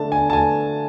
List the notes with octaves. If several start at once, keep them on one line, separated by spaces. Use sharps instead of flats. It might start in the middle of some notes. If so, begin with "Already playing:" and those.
Already playing: D3 A3 D4 A5
D3 G#5
A5
A3 G#5